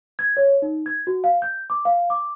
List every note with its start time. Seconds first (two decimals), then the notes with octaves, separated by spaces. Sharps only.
0.19 G#6
0.37 C#5
0.62 D#4
0.86 G#6
1.07 F#4
1.24 F5
1.42 G6
1.70 D6
1.85 F5
2.10 D6